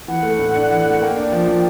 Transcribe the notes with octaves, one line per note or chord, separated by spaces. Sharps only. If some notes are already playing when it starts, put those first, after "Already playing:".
E3 F#5
A3
A2
D4
E3
A3
A#3 G5
D4
F3
F3